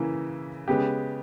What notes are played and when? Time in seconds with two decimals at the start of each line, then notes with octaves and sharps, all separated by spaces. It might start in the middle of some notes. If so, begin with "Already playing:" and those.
Already playing: C#3 E3 A#3 E4
0.68 C#3 G#3 B3 G4